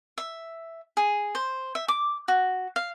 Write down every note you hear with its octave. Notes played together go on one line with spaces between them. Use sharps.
E5
G#4
C5
E5
D6
F#4
F5